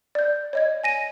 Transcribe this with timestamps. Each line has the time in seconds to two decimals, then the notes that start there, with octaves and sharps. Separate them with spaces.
0.15 D5 G6
0.53 C#5 D#5 G#6
0.84 G#5 A#6 D#7